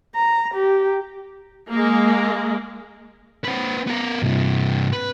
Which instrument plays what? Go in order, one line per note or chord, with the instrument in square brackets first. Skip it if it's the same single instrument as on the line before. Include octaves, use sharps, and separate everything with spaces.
[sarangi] A#5
G4
[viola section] G#3 A#3
[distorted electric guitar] C4 B4
B3 A#4
G2 C3
B4